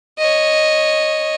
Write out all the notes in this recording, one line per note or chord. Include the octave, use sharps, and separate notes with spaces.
C#5 D#5